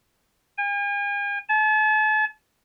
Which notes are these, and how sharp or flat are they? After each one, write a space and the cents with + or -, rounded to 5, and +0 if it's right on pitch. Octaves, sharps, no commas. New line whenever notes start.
G#5 -45
A5 -40